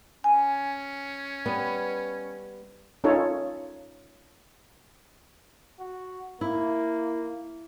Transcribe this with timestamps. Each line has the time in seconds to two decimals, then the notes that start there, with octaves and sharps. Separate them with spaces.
0.24 C#4 G#5
1.46 G3 B3
3.04 C#4 D#4 F4 A4 C#5
5.79 F#4
6.41 A#3 E4